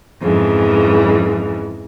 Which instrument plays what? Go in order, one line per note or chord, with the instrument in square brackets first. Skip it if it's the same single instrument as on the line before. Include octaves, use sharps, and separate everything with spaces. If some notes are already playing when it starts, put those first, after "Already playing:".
[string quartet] F2 G#2 C#3 E3